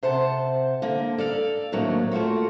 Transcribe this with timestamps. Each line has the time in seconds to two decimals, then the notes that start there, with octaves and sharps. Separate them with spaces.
0.03 C3 C5 F#5 A5
0.82 D3 A#3
1.18 A4 D5 F5
1.72 D#2 A2 F#3 A#3 C4 D4
2.11 A3 A#3 F4 F#4